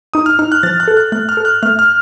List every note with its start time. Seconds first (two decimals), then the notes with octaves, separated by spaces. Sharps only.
0.14 D#4 D#6
0.26 F6
0.39 D#4 F6
0.52 F#6
0.63 F3 A6
0.80 F#6
0.88 A4
0.97 F#6
1.12 A3 F#6
1.29 F6
1.37 A4
1.45 F#6
1.63 A3 F6
1.79 F6